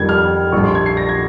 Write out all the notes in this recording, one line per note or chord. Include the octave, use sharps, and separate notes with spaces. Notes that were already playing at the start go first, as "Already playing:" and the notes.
Already playing: F2 D#3 G3 G#6
F6
A#1 A#2 G3 C#6
C6
G#6
C7
A#6
G#6